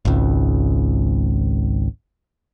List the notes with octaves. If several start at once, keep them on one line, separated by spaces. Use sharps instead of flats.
G#1 C#2